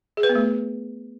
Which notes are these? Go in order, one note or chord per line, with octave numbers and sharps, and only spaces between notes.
G#4
B4
B3
A3